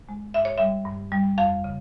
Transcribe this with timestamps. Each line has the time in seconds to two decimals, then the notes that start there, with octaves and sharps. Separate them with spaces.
0.09 G#3
0.34 G2 E5
0.45 C#5
0.58 G3 E5
0.85 G2
1.12 G3
1.38 F2 F5
1.64 C#3